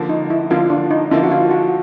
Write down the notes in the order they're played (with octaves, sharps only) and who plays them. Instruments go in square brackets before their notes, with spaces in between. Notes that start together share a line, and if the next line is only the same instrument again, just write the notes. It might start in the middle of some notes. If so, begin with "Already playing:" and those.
Already playing: [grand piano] D3 F3 A#3
[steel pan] D#4
E4
[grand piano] D3 F3 A#3 [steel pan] F4
[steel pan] D4
D#4
[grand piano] D3 F3 A#3 [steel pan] E4
[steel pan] F#4
F4
F#4